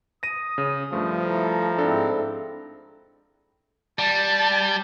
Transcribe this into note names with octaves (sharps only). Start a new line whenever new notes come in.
D#6 A#6 D#7
C#3
G2 F3 A3
E4 A4 A#5
G#2 C4 D4 E4 A4
G3 A5